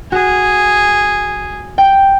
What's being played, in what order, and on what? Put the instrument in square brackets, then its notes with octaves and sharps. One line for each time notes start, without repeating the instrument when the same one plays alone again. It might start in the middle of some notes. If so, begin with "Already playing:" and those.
[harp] F#4 [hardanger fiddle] G#4
[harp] G5